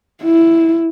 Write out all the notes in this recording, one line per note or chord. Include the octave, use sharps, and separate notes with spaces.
E4